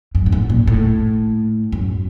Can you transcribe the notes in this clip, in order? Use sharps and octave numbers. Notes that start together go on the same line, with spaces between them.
F#2
A2
F#2
A#2
A2
F#2